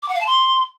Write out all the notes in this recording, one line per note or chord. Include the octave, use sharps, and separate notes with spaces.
D6
F#5
F5
A5
C6